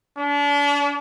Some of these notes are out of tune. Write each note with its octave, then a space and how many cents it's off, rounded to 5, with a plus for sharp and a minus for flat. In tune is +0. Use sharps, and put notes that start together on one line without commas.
D4 -35